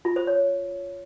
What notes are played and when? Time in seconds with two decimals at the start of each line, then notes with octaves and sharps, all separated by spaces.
0.05 F4
0.16 C5
0.27 C#5